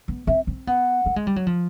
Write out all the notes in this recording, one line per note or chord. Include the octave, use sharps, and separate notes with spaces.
B3
C4 E5
C4
B3 F#5
A3
G#3
G3
F#3
F3